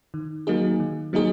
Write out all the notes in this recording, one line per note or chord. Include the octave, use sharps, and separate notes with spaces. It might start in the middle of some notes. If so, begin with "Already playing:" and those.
D#3
F#3 A#3 D#4 G#4
D#3
F#3 A#3 D#4 G#4